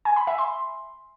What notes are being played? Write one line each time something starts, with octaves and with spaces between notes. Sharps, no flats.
G#5
B5
E5
C6